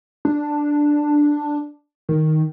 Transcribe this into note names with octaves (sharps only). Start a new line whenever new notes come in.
D4
D#3